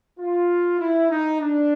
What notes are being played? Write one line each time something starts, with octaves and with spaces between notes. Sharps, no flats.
F4
E4
D#4
D4